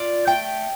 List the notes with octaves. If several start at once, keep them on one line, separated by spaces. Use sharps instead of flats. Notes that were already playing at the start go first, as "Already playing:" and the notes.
Already playing: F4 D5
A3 G5